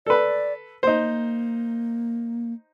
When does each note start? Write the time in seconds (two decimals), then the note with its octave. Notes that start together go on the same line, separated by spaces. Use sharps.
0.06 A4 B4 D5
0.83 A#3 D#4 C5